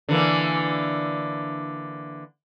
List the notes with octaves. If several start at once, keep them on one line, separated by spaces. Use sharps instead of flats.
D3 E3 A#3